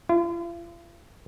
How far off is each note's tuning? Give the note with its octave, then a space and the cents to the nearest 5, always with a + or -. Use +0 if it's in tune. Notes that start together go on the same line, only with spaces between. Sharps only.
F4 -45